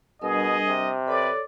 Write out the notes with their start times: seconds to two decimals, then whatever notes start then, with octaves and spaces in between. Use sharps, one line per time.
0.22 B2 G3 D4 G#4 A#4 D#5
0.65 C3
1.08 A4 B4 C#5 D5